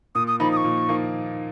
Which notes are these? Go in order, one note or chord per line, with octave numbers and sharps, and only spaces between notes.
A#2 D#6
D#6
F3 A#3 D#4 B5
D#6
C#6
A#2
F3 A#3 D#4